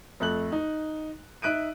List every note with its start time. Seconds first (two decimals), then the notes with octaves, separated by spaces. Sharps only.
0.20 F2 A3 F#6 F#7
0.52 D#4
1.42 D#4 E5 F#6 D7 D#7